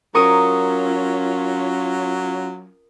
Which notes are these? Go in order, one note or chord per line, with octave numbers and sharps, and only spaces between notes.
F#3 C#4 F4 A#4 C#6 D#6